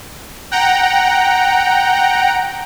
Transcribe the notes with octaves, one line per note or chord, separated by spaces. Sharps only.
F#5 G5 A#5